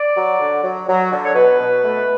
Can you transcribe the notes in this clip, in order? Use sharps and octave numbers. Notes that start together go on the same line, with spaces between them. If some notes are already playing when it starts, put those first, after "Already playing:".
Already playing: D5
F#3
D3
F#3
F#3
D3
C#5
B2 B4
B2
A3